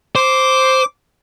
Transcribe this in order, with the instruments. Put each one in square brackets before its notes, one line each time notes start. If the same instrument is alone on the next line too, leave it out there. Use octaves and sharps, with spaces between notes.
[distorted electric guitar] C5 [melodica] D6